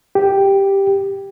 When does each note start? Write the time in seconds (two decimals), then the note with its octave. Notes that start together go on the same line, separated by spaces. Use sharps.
0.15 G4